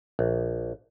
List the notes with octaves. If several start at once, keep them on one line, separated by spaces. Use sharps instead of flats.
A#1